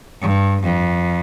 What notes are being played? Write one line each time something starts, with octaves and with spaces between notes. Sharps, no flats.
G2
F2